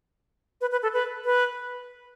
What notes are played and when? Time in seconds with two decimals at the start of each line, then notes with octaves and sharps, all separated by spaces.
0.61 B4
0.72 B4
0.83 A4
0.93 B4
1.25 B4